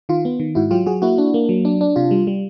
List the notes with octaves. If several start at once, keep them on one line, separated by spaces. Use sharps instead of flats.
D#3 F4
B3
D#3
G#2 E4 F#4
F#3 F4 G4
F#3 F#4 G#4
A#3 E4 F#4
D4
A#3
F#3
D4
D4
C3 F4
G3
G3